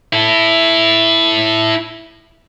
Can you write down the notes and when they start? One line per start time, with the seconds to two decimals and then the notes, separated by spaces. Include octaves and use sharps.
0.13 E4 A4